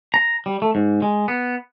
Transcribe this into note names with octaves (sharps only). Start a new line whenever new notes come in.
A#5
G3
A3
G#2
G#3
B3